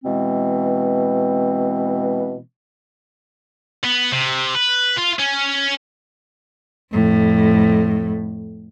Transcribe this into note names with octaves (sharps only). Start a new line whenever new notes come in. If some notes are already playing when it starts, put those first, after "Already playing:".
B2 E3 G#3 C4
B3
C3
B4
F4
C#4
F2 A2